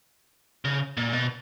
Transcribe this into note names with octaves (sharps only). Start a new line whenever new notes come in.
C#3
A#2
B2